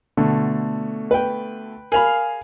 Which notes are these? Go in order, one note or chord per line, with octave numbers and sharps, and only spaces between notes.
B2 D3 A3
B4 G5
G#4 A#4 F5 B5